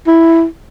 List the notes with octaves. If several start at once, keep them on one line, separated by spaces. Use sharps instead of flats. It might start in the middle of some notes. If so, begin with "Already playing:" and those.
E4